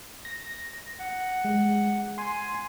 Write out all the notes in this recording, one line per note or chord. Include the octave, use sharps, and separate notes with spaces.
A#6
F#5
G#3
G#5 C6